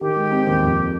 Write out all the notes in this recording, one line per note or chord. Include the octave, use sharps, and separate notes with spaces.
D#3 G4
G#3
C4
D#2
F2